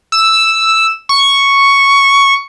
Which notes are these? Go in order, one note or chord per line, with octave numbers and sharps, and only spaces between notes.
E6
C#6